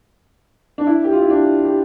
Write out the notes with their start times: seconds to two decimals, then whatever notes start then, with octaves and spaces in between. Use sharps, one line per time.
0.78 D4
0.87 E4
1.04 G4
1.13 F4
1.22 E4
1.30 D4
1.65 G4